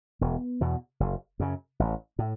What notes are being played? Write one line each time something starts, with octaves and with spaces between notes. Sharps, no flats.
E1 B3
E2 B2
F#1
F#2 C#3
A1
A2